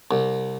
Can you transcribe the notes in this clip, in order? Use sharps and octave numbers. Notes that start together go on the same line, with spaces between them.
C2